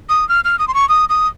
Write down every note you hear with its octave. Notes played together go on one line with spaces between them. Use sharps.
D#6
F6
F6
D#6
C6
C#6
D#6
D#6